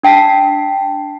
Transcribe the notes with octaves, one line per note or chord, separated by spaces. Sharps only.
D4 G5 A5 B6 C7